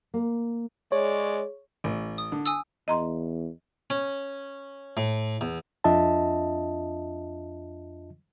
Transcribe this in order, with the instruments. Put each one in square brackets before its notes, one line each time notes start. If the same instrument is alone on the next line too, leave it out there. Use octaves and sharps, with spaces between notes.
[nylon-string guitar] A#3
[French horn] G#3 [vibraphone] G#4 [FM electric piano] C#5 [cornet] D5
[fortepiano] A1
[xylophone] D#6
[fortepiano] D3
[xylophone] G#5 D#6 E6
[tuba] E2 [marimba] D#5 A#5 C6
[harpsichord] C#4
A2
E2
[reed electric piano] F2 D4 F4 D#5 E5 A5